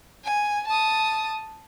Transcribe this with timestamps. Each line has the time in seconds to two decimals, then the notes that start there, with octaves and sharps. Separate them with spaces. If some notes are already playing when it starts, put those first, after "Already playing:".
0.24 G#5
0.67 A5 D#6